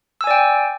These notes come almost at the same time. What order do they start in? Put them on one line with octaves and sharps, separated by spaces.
E6 G#5 D5 G5